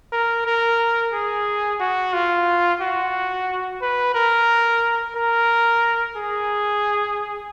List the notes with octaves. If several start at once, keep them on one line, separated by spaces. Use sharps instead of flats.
A#4
A#4
G#4
F#4
F4
F#4
B4
A#4
A#4
G#4